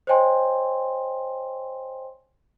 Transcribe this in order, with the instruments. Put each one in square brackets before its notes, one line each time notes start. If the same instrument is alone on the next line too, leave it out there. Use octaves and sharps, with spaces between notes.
[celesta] C5 C#5 D#5 G5 G#5 C6